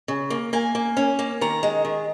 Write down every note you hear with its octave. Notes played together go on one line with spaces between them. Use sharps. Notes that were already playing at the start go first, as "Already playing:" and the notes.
C#3
A#3
A#3 G#5
A#3
C#4
A#3
D#3 A#5
G#3
D#3